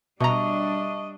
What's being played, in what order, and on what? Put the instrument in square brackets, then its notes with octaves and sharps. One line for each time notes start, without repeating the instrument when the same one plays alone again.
[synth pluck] B2 A#5 [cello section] G3 D4 [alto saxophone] D#5 [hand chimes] E5 A5 C#6